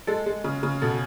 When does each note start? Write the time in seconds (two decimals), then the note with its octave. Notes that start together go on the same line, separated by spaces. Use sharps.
0.07 G#3 A4
0.26 G#3
0.44 C#3
0.63 C#3
0.82 B2 A4